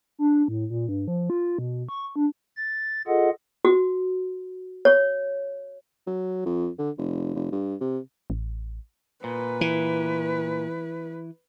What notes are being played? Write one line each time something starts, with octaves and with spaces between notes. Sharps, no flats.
D4
A2
A#2
G2
F3
F4
B2
C#6
D4
A6
F4 G#4 A4 D#5 F#5
F#4
C#5
F#3
F2
D3
F1
F1
G2
C3
A1
A#2 B4
E3